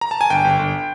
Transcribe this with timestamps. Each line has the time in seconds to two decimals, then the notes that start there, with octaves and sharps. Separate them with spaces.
0.01 A#5
0.11 A5
0.21 G#5
0.30 G1 G5
0.44 G1
0.59 G1